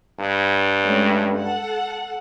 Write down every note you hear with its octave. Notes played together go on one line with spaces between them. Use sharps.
G2
G#3 A3 C#4
A4 F#5